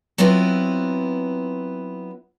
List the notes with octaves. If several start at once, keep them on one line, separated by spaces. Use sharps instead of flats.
F#3 B3 C4 E4 F4 B4